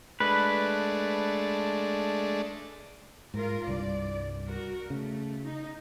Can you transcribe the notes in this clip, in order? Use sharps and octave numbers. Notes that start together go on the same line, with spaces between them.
G#3 A3 D4 B4
G#2 F4 A#4
C2 G2 D5
F#4 A#4
C#3 A3
D#4